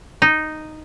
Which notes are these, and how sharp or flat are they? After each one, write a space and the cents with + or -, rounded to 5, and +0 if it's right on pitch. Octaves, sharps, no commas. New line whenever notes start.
D#4 -5